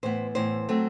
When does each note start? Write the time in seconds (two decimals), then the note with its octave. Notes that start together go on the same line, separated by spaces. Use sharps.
0.03 A2 E3 B3 C5
0.35 A2 E3 B3 C5
0.69 F#3 A3 C4